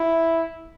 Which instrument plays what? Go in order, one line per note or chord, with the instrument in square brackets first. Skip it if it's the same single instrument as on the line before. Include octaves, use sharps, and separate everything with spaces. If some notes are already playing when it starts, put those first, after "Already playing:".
Already playing: [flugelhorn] E4